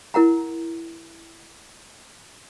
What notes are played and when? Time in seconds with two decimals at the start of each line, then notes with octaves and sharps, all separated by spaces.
0.14 E4 A#4 F#5 A#5